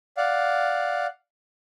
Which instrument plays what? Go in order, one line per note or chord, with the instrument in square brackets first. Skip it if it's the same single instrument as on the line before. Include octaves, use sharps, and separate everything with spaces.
[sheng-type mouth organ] D5 F5 F#5